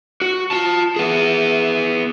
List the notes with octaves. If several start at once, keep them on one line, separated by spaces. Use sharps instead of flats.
F#4
F4 A5
B3 G#4